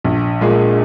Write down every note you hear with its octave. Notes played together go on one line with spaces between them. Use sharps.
A#1
A#2 G#3